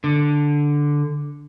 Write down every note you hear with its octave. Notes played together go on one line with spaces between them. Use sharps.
D3